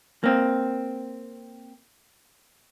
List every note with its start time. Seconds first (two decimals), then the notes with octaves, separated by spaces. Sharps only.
0.24 A#3 C4